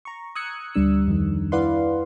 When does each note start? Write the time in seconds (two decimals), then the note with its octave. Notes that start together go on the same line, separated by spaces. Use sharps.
0.05 A#5 C#6
0.35 D#6 E6 F#6 G#6 C#7
0.75 D2 G3 D4 E6
1.08 F2 D#3
1.52 E4 B4 D5 F5 F#5 C6